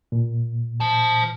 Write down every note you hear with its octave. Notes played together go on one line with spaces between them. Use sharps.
A#2
C5 A5